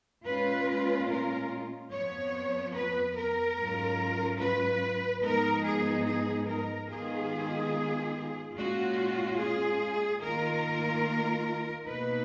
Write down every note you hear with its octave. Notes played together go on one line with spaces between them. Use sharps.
A#2 G#3 C#4 F4 B4
A#4
F2 F3 B3 C#5
B4
A#4
G#2 F#3 C#4 F4
B4
G#2 F3 G#3 B3 D#4 A#4
G#4
G#4
A#4
D#3 G#3 B3 F4 G#4
A#2 G#3 C#4 F4 F#4
G#4
D#3 A#3 F4 A#4
B2 A#3 D#4 B4